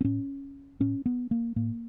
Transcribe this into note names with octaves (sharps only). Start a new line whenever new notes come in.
C4
A2 C#4
A2 C#4
B3
A#3
A2 A#3